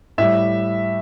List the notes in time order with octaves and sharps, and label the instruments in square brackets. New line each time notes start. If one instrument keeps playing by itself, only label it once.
[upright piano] A2 G3 E5